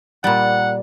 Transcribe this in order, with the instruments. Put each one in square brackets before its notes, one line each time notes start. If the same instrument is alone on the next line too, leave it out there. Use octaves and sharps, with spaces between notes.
[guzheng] A#2 G3 [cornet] F#5